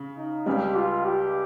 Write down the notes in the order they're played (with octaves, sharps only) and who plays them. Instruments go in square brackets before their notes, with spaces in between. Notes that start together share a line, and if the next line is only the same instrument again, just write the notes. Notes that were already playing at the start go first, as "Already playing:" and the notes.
Already playing: [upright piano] C#3
[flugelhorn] D#4
[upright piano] C#2 C#3 G3 [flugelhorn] G4
[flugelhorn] F4
G4